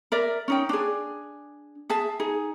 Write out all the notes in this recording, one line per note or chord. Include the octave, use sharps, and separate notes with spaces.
A#4 D5 E5
C#4 D#4 G5
D4 G#4
G#4 E5 A5
D#4 G#4